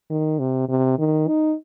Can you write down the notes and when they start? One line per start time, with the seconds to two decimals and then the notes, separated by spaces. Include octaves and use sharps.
0.10 D#3
0.39 C3
0.69 C3
0.99 D#3
1.28 D#4